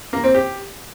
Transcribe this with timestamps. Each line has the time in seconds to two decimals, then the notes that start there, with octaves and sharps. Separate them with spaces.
0.13 A#3
0.24 C4
0.35 G4